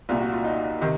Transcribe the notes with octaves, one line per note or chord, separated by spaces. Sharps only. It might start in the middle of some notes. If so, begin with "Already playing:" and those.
C2 A#2 F4
F#4
F4
D#4
C3 D#3